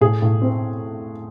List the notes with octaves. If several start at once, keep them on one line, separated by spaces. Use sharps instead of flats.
A2 G#4
A2
C4